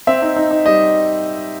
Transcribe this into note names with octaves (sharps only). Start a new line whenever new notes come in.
C4 E5
D#4
D#4
D#4
G3 D#5